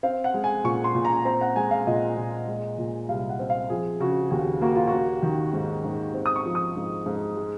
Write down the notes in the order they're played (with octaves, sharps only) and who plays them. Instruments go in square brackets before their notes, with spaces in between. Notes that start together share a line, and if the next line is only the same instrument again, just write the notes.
[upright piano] C4 F5
F#5
G#3
G#5
A#2 C#6
C6
A#2
A#5
C4 A#5
F#5
G#3 G#5
F5
A#2 D#5
A#2
G#3
A#2
C2 F5
F#5
C4
F5
F3 G#4
C#3 F#4
D#2 F#4
A#3 F#4
F4
F#4
A#3
D#3
G#2
G#2
C4
D#6
C#6
F3
D#6
G#2
G#2
G#3